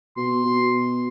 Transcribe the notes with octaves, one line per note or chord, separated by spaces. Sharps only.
B2 C6
B2